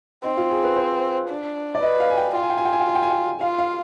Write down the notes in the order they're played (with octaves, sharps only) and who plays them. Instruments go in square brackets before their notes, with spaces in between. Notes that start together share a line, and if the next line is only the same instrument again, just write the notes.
[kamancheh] C4 [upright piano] D#4
[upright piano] F4
G#4
B4
C5
[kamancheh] D4
[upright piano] D5
[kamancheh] B4 [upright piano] D#5
[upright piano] F5
G#5
G5
[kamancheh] F4 [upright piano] G5
[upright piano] G#5
G5
G#5
G5
G#5
G5
G#5
G5
G#5
G5
[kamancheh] F4 [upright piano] F5
[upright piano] F5